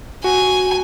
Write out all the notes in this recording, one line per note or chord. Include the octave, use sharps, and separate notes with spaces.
F#4 G#5